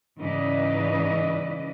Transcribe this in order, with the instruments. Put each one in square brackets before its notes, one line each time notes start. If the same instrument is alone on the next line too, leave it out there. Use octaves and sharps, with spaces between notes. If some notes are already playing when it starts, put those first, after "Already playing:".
[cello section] G#2 C#3 E3 B4 D5 D#5